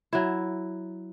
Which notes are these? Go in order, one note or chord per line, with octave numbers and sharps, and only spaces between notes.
F#3 E4